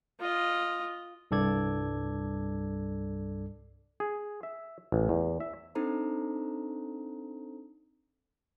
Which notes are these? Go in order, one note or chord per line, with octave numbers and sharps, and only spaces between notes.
F4 D#5
C2 G2 A4 D5 G#6
G#4
E5
A1
E2
E5
C4 D4 D#4 A4 C5 A#5